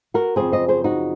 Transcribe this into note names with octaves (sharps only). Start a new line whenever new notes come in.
F#4 A#4
F#2 C#3 F3 C4 G#4 C5
C5 D#5
G#4 C5
D#4 F#4